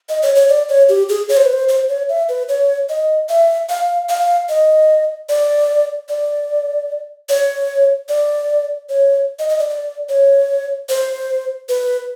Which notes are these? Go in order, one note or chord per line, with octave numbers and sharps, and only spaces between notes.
D#5
C#5
C#5
D5
C#5
G4
G#4
C#5
C5
B4
C5
C5
C#5
E5
B4
C#5
D#5
E5
F5
F5
D#5
D5
D5
C#5
D5
C#5
D#5
D#5
D5
D5
C#5
C5
B4